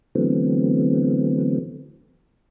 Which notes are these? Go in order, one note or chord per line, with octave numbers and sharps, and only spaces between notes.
D3 E3 F#3 A3 B3 C4